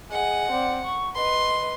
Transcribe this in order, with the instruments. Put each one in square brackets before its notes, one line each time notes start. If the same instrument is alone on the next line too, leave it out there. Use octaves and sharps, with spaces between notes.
[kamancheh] G#4 D#5 [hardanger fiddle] F#5
[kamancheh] C4 D5
C#6
[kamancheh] B4 D#5 [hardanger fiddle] C6